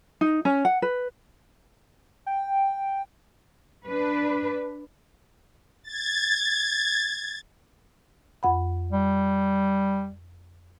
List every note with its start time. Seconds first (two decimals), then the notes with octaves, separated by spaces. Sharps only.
0.21 D#4
0.45 C#4
0.65 F#5
0.82 B4
2.26 G5
3.86 D4 B4
5.83 G#6 A6
8.43 F2 F#5 B5
8.92 G3